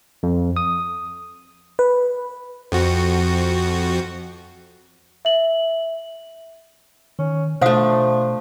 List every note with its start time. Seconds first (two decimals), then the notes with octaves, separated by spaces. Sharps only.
0.23 F2
0.57 D#6
1.79 B4
2.72 F2 F#4
5.25 E5 F#7
7.19 D#3 C#4
7.62 B2 F3 A3 D4 C5 F5 D#6